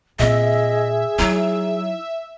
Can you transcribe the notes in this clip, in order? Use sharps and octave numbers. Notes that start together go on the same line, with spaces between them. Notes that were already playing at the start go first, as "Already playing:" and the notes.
A#2 C4 G#4 D#5 E5
F#3 D#4 E4